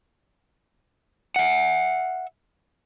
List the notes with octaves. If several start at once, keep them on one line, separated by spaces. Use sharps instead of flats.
E5 F#5